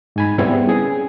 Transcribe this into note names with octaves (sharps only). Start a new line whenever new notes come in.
G#2 G#5 B5
G3 B3 C4 E4 G#4
C#4 G#4